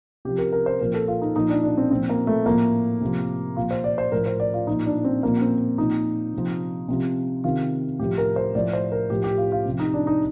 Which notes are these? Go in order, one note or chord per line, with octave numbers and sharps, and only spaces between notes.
C3 F3 G4
A#4
A#4
C5
A#2 F3 A#4
A4
F4
D#4
A#2 F3 D#4
D4
D4
C4
A#2 F3 C4
A#3
A3
A2 F3 A#3
C3 F3
A#2 F3 F4
C5
D5
C5
A2 F3 A#4
C5
D5
F4
A#2 F3 D#4
D4
C4
A#2 F3 A#3
C4
A#2 F3 D#4
C3 F3
C3 F3
C3 D#3 F4
A2 F3 G4
A#4
C5
A2 F3 D5
C5
A#4
A2 F3 G4
G4
F4
F4
C3 F3
D#4
D4
D#4